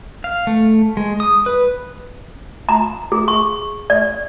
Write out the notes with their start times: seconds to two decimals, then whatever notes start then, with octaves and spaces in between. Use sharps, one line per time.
0.24 F5
0.47 A3
0.97 G#3
1.20 D#6
1.46 B4
2.69 A#5
3.12 G#4
3.28 C#6
3.90 D5